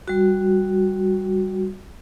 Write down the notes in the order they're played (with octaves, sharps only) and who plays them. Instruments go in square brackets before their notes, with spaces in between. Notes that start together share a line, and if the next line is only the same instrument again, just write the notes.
[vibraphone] G3 F#4